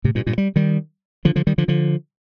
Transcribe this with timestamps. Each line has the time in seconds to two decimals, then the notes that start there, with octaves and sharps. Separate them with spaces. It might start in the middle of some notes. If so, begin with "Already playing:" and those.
0.04 A2 C3
0.15 G2 A#2
0.27 G2 A#2
0.38 G3
0.56 D#3 G3
1.25 D3 F3
1.36 D3 F3
1.47 D#3 G3
1.58 D3 F3
1.68 D3 F3